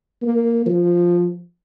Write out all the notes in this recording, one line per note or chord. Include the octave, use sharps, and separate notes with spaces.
A#3
F3